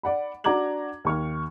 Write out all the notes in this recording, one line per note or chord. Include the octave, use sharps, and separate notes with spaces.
D5 F#5 B5
D4 F#4 A#5 D6 G#6 F#7
D#2 C#6 F6